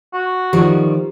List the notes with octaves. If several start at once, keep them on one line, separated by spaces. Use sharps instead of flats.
F#4
D#3 F3 G3 G4